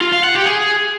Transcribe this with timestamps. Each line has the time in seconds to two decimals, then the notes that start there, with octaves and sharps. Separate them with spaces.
0.01 F4
0.13 F5
0.24 F#5
0.35 G4
0.46 G#4